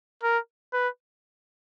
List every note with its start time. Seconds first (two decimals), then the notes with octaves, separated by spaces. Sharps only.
0.23 A#4
0.73 B4